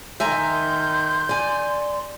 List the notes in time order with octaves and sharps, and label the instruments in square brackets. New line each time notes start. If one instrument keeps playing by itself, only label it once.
[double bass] D#3 [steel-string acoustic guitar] E5 G#5 A#5 [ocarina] C6 [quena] G6
[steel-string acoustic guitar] D5 G#5